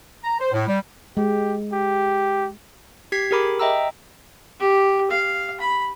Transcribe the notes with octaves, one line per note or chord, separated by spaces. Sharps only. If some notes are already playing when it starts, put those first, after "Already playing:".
A#5
C5
A2
G3
G#3 G4
G4
G4 G#6 B6 C7
G4 G#4 A#4 B5 D6
D#5 E5 G5 A#5 E6
G4
F5
B5